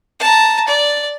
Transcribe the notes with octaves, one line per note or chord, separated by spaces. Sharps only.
A5 A#5
D5